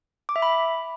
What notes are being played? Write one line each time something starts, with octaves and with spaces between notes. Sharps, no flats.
D6
E5
B5